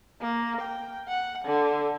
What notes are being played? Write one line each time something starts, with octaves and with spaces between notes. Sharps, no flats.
A#3
G5
F#5
D3